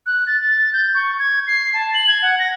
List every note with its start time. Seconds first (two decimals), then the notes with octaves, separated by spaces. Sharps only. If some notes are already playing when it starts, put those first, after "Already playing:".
0.06 F#6
0.27 A6
0.41 A6
0.73 G6
0.95 C#6
1.19 G#6
1.47 C7
1.73 A5
1.94 F#7
2.08 G#6
2.22 F#5
2.39 A#6